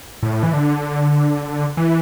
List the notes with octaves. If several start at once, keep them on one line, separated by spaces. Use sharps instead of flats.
A2
E3
D3
E3